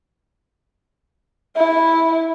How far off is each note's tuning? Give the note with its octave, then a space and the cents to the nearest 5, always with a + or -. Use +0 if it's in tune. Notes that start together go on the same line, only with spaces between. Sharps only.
E4 -10